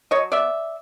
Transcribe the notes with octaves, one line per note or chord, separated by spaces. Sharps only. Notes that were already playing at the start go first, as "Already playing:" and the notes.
F#3 C#5 D#5
B3 D5 E5